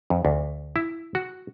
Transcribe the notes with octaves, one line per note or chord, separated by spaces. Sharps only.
F2
D2
E4
F#4